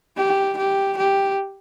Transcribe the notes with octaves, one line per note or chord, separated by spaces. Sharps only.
G4
G4
G4